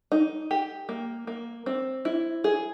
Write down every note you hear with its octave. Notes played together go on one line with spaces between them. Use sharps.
D#4
G4
A#3
A#3
C4
E4
G#4